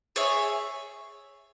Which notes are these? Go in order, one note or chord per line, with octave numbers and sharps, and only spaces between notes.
G#4 C#5 E5